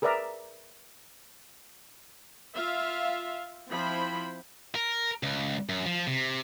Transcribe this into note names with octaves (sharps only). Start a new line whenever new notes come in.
G#4 A#4 B4 D5 E5 A#5
F4 E5 F5
F3 C4 E4 C5 B5
A#4
C#2
F#2
F3
C3